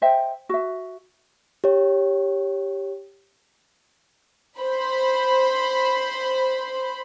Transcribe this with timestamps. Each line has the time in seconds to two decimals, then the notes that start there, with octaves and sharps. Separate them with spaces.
0.02 C5 D#5 E5 G5
0.49 F#4 E5
1.64 G4 C#5
4.60 C5 B5